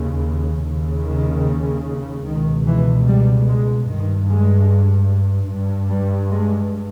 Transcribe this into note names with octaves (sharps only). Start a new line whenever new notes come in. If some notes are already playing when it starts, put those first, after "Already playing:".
Already playing: D#2 C#3
D#2 C#3
D#3
C#2 B2 D#3
E3
G3
G#3
G2 D#3
G#3
G2
G3
G#3